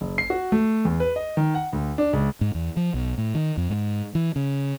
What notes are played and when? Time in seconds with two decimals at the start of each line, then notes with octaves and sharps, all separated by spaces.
0.01 F#1
0.18 C7
0.30 F#4
0.52 A3
0.85 E2
1.00 B4
1.16 D#5
1.37 D#3
1.55 F#5
1.73 D2
1.98 D4
2.13 C#2
2.41 G#2
2.55 E2
2.77 F3
2.94 B1
3.18 A2
3.35 D#3
3.57 F2
3.70 G#2
4.15 E3
4.36 C#3